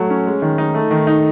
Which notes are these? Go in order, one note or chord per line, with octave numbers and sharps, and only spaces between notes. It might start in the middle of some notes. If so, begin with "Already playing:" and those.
Already playing: F#3 A3
C#4
G#3
D#3
D#4
A3
D#3
D#4